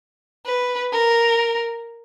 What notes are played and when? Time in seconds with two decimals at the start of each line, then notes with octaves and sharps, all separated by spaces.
0.46 B4
0.93 A#4